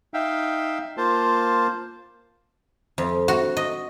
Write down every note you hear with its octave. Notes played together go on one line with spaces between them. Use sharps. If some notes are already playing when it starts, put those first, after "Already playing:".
D#4 E5 F5 G5
A#3 F4 C5 A5
F2
F#4
D#5